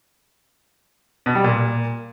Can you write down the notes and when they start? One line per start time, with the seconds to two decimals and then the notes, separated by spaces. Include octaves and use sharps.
1.26 B2
1.35 G3
1.44 A#2